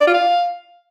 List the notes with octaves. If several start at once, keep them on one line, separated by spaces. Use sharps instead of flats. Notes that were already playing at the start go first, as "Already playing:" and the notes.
D5
F4
F5